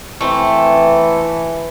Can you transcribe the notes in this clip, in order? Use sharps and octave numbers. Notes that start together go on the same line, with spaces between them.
E3 A3 C4